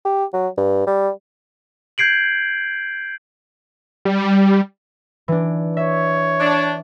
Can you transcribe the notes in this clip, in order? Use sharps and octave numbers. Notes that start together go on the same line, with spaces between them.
G4
F#3
G2
G3
G6 G#6 C7 D7 F#7
G3
E3 D4
C#5 E5
D4